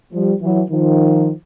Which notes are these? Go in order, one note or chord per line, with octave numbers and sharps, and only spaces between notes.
F3 G3
E3 F#3
D#3 F3